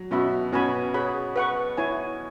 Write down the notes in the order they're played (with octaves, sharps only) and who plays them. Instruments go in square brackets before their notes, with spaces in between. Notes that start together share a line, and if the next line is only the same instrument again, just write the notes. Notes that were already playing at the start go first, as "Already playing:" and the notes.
Already playing: [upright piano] F#3
[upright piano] B2 [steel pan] C#4 F#4 E5 B5
[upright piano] B2 [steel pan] C#4 F#4 B4 G#5 B5
[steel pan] G#4 C#5 F#5 B5
B4 F#5 C#6
E4 C#5 G#5